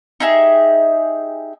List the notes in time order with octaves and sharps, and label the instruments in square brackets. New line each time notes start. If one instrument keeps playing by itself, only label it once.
[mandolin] D#4 G4 G#4 E5